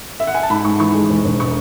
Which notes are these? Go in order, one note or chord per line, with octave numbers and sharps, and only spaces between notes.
E5
F#5
G#5
A5
G#2 B5
G#2 C#6
E3 C#6
G#3
E1
E1
C#6